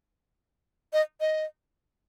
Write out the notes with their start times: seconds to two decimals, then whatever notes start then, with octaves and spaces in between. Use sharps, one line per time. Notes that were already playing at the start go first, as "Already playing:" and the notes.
0.93 D#5
1.21 D#5